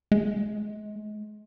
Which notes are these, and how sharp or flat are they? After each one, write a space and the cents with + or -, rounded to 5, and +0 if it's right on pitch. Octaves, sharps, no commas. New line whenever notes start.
G#3 +30